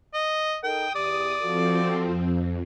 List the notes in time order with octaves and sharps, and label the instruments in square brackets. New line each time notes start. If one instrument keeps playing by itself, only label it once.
[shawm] D#5
[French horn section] D#4 A4 A#4 [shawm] G5 [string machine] D#6
[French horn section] E2 G4 [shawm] D5
[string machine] F3 C4 [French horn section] F4 F#4 A4
[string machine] F2